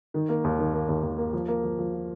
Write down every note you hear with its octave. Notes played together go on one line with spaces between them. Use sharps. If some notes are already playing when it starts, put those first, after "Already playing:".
D#3
A#3
D#2
D#3
A#3
D#2
D#2
A#3
F3
A#3
F3
F3
F4